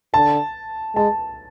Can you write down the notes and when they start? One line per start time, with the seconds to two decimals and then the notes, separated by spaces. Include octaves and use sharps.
0.14 D3 A5
0.96 G#3 A5